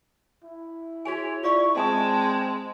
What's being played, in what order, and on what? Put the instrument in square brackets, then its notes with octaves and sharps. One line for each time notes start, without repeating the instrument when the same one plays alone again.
[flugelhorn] E4
[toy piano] F#4 G#4 G#5 [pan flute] C#5
[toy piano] F4 D5 F5 [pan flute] C#6
[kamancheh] G#3 [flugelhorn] C4 [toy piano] D#5 G#5 D#6 [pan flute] A5